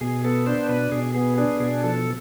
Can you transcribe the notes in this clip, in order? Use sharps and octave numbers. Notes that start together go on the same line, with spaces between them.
B2 G#4
B3 A4
D4 C5
B2 B4
B2 G#4
B3 G#4
D4 G#4
B2 G#4
F3 A4